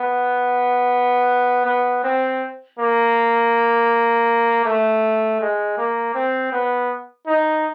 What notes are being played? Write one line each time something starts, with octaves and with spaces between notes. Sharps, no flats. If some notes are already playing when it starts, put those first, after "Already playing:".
Already playing: B3
B3
C4
A#3
A3
G#3
A#3
C4
B3
D#4